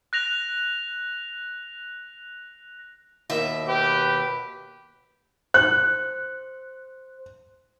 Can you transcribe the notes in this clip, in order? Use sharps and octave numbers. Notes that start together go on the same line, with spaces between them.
F#6 A#6 F7
D#2 B2 E5
G4 B4
C5 F#6